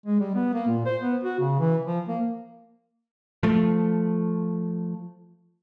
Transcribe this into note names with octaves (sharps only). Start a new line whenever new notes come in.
G#3
G3
B3
A#3
A#2
C5
B3
F#4
C#3
E3
F3
A#3
F3 A3